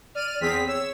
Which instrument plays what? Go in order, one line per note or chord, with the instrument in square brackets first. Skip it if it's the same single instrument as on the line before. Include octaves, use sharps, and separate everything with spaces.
[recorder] D5 [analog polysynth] F6 D#7
[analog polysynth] E2 C4 B6 [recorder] G#4
[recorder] C#5 [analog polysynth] E6